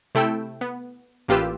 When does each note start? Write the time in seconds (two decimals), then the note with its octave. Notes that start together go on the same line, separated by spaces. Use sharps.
0.15 C3 A3 E4 G5 E6
0.61 B3
1.28 A1 A#3 F4 G4 B4 E6